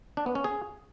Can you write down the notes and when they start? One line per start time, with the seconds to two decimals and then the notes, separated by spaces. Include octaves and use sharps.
0.17 D4
0.26 B3
0.35 C#4
0.44 G#4